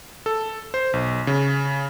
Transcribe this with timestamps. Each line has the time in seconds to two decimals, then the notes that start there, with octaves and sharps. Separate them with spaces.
0.26 A4
0.74 C5
0.93 B1
1.27 C#3